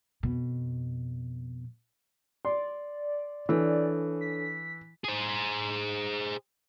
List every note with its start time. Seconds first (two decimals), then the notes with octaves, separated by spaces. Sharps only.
0.23 F2 B2
2.45 D5 C6
3.49 E3 D4 A4 C#5
4.21 B6
5.04 G#4 C5